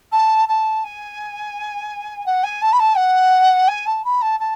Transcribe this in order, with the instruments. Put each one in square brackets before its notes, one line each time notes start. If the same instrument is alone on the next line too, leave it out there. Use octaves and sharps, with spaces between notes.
[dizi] A5
A5
G#5
F#5
G#5
A5
B5
A5
F#5
G#5
A5
B5
A5
A5